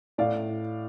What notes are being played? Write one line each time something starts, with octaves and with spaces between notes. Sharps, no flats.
A2 D5 F5